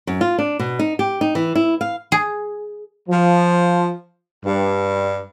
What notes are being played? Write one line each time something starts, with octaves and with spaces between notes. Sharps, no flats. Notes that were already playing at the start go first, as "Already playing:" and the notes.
F#2
F4
D4
B2
D#4
G4
D#4
E3
E4
F5
G#4
F3
G2